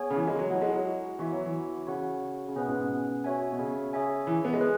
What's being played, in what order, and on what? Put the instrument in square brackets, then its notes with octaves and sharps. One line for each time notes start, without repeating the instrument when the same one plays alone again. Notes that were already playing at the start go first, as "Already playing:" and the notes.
Already playing: [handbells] B3 G#4 C#5 G#5
[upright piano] C#3
E3
G#3
F#3
[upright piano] F#3 [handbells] E4 C#5 F#5
[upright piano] G#3
F#3
[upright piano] E3 [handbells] B3 F#4 E5
[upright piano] F#3
E3
[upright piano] C#3 [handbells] F#4 C#5 F#5
[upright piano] C#3
[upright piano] B2 [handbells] C#4 G#4 B4 F#5
[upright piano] G#2
B2
[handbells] F#4 C#5 E5 G#5
[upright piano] B2
C#3
[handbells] G#4 C#5 E5 G#5
[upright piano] E3
B3
G#3
[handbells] G#4 B4 G#5